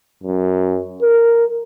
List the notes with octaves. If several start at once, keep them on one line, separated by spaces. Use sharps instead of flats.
F#2
A#4